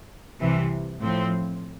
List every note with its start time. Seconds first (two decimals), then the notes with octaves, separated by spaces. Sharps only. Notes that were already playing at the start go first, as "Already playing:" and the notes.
0.41 C2 C3 E3
1.02 A2 F3 C4